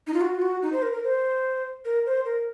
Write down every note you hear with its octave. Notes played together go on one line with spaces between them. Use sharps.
D#4
F4
F#4
F4
F#4
D#4
C5
A#4
A#4
C5
A#4
C5
A#4